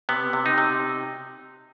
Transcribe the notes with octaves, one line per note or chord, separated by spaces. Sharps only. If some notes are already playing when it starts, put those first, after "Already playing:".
C3 B3
C3
D#4
C3